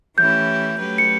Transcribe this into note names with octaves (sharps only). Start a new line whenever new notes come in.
E3 A3 C#4 E4 G4 G6
F#3 A3 C#4 G4 B4
C#7